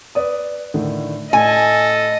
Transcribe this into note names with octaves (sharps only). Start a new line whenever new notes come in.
B4 D5 D#6
A2 D3 D#3
A2 A4 D#5 G#5